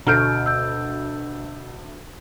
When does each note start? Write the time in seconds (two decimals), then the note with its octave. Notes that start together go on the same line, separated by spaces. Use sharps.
0.07 D2 B2 A4 A#5 F6 G6 D7
0.46 E6 G6